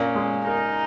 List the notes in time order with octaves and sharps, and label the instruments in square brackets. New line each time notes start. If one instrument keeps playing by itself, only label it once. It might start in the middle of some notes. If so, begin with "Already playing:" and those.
Already playing: [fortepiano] A#2 [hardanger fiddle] C#4
[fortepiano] G#3
[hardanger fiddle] D#4 [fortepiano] A#4